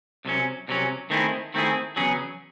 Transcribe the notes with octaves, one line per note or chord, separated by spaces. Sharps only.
C2 C3 F#3 C#4
C2 C3 F#3 C#4
D#3 A3 C4 E4 G#4
D#3 A3 C4 E4 G#4
E2 C#3 F#3 C#4 G#4